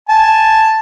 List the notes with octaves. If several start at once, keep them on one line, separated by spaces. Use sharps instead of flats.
G#5 A5